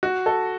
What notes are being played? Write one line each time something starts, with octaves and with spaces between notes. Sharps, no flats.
F#4
A4